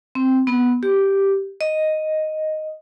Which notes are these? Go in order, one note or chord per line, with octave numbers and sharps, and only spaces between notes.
C4
B3
G4
D#5